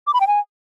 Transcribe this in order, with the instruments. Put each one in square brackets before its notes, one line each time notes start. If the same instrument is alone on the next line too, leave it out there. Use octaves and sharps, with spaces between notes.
[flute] D6
B5
G5
G#5